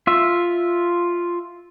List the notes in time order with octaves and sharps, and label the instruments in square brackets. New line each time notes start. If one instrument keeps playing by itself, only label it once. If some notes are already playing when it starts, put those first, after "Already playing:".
[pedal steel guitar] F4 E5